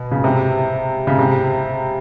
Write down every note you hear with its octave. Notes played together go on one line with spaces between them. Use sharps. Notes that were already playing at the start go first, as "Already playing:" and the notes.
Already playing: B2
C#3
C3
C#3
C3